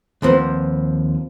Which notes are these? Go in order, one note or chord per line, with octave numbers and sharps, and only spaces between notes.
D#2 F3 C4 B4 F#5